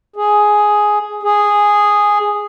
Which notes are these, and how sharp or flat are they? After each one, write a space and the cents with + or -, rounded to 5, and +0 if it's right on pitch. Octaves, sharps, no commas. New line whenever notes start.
G#4 +5
G#4 -5